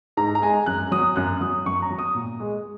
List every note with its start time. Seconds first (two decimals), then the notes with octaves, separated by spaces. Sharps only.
0.17 G#2 A#5
0.35 A#5
0.42 G#3 G#5
0.66 F#2 F#6
0.92 F#3 D#6
1.16 F#2 F#6
1.41 F#3 D#6
1.66 F#2 C#6
1.82 A#5
1.90 F#3
1.99 D#6
2.15 A#2
2.40 G#3